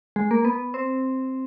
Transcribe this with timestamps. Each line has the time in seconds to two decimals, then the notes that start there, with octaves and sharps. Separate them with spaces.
0.16 G#3
0.31 A#3
0.45 B3
0.74 C4